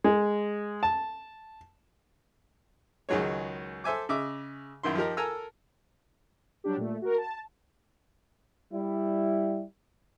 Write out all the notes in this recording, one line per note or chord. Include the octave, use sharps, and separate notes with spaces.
G#3
A5
C#2 D#3 F#3 G#3 C#5
A4 C5 E5 G#5 D6
C#3 D#5 E5 D6
F#2 D#3 E4 C6
F3 D#4 G4 A#4
A4 A#4 G#5 A#5 E6
F#3 G3 D4 G4
A#2 A3
F#4 A#4
A5
G3 E4